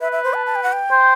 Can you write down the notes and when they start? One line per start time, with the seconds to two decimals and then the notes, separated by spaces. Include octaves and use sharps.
0.01 B4 E5
0.12 E5
0.24 C5
0.34 A5
0.46 A5
0.55 G5
0.63 F#5
0.73 G5
0.91 C5